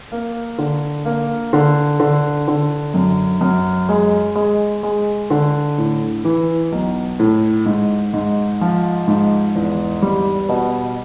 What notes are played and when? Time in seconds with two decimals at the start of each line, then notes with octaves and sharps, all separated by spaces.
0.12 A#3
0.58 D3
1.05 A#3
1.53 D3
2.00 D3
2.48 D3
2.94 F#2
3.41 F#2
3.89 G#3
4.35 G#3
4.83 G#3
5.30 D3
5.78 A2
6.24 E3
6.72 B1
7.19 A2
7.66 G#2
8.13 G#2
8.61 F3
9.08 G#2
9.55 E2
10.02 G3
10.49 B2